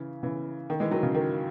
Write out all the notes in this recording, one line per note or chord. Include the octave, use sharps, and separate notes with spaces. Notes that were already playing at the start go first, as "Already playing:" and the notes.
Already playing: C#3 E3
C#3 E3
D#3
E3 G#3
D#3 F#3
C#3
D#3